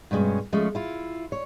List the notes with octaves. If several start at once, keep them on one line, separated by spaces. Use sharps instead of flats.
G2 B2 G#3 C#4
F3 G#3 A3 C#4
E4 F4
C#5